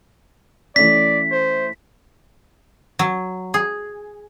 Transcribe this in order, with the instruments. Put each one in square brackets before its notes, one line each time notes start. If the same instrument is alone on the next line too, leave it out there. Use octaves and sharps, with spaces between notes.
[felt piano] E3 A3 C#4 [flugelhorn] D5 [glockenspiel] B6
[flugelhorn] C5
[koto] F#3
G#4